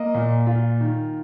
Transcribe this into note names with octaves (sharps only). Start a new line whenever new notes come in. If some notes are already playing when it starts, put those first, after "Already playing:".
Already playing: A#3 D#5
A#2
F4
D#3